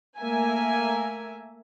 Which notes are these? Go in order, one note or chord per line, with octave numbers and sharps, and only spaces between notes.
A3 A#3 A#4 E5 G#5